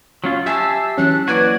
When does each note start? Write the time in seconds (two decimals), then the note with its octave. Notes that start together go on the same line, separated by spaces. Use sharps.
0.24 F#3 C#4 F4
0.46 G4 E5 G#5 A5 E6 C7
0.98 E3 F#3 C#4 F#6
1.28 A#3 E4 F#4 B4 D5 G#6